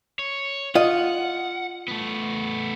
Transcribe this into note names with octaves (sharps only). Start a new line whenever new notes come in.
C#5
F4 D#5 F#5
A3 B3